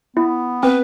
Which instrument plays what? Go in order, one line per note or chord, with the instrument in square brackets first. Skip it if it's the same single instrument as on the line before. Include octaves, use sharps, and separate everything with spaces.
[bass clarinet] B3 [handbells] E4
[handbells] C4 [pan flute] B4